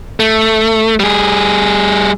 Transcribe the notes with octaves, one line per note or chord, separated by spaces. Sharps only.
A3
G3 G#4